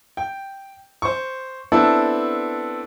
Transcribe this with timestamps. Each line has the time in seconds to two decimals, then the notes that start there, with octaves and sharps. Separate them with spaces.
0.17 G5
1.02 C5 C#6
1.72 B3 C4 D4 E4 A4